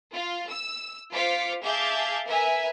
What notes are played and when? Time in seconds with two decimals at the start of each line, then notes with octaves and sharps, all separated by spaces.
0.14 F4
0.50 E6
1.11 F4 C5 F5 D6 B6 C#7
1.63 G#4 E5 F5 A5 D6 G6
2.26 A#4 B4 E5 G#5